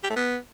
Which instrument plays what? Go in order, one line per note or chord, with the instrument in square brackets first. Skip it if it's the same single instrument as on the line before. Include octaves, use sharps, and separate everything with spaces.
[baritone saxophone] G4
A3
B3